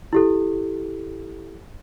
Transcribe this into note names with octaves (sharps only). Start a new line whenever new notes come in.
E4 G4 A4